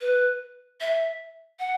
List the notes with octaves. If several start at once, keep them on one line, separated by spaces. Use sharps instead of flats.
B4
E5
F#5